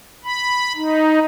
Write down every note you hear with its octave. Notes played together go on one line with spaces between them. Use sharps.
B5
D#4